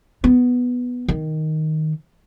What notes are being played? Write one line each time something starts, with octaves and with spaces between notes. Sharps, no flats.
B3
D#3